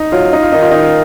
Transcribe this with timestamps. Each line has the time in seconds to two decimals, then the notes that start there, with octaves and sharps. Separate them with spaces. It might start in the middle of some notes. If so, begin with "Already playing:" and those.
Already playing: D#4
0.12 F#3 F4
0.33 D#4
0.43 F4
0.52 D#3 D#4
0.62 F4
0.71 D#4
0.81 F4